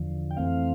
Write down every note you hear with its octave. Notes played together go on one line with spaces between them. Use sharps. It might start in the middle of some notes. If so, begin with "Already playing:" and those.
Already playing: E2 D3 F3
G5
F2 E3 A3 C4 F5